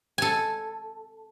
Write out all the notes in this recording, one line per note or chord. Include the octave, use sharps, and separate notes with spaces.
A4 G#5